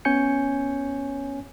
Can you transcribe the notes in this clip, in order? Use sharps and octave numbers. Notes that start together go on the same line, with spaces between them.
B3 C#4 C#5 G#5 G6 C#7